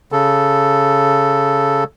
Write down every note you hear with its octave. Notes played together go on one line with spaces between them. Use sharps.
C#3 A4